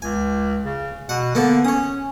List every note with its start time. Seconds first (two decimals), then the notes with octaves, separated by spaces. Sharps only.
0.02 C#2 G#5
0.65 C#3
1.09 B2 F#5
1.35 D3 A#3 B3 A4
1.65 C#4 C#5 D#6